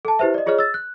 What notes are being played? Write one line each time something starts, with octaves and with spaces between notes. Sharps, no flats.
A4 A5
E4 G4 B4 C5 E5
D5 D#5
F4 G#4 C#5 D#5 F6
E6 A6
F#6